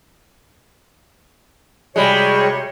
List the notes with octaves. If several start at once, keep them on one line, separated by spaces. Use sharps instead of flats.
C3 G3 G#3 F#4 C#5